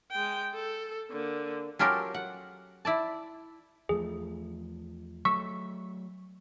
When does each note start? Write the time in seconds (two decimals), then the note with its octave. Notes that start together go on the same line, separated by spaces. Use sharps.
0.12 G#3 G5
0.55 A4
1.10 D3 A#3
1.79 F#3 C#4 F4 G4 A4 A#4
2.14 F#5
2.85 E4 D5 A5
3.89 E2 F3 A3 G#4
5.25 F#3 A3 C#6 E6 B6